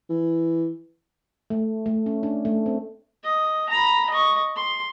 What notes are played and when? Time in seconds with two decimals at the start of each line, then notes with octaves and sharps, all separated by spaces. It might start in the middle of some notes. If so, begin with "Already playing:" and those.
0.10 E3
1.50 A3
1.86 A3
2.06 C#4
2.23 D4
2.45 A3
2.66 C4
3.24 D#5
3.69 A#5 B5
4.10 D#5 C#6
4.56 C6